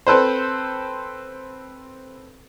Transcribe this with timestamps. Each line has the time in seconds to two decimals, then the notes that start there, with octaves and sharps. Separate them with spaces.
0.07 C4 A4 B4 C5